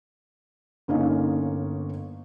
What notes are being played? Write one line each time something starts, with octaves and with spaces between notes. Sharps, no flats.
G1 A#3 C#4 D#4